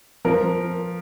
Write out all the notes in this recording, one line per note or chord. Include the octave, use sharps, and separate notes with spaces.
F3 A#4